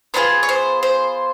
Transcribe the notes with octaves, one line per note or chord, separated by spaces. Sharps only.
B3 D4 F4 G#4 C5
C#5
C5
C5